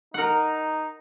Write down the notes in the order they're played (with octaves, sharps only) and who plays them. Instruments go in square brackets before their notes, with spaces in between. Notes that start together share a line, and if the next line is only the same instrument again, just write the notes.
[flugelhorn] D#4 [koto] A#4 F#5